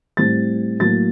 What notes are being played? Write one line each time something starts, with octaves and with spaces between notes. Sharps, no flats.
A2 G3 C4 A6
A2 F#3 A#3 A6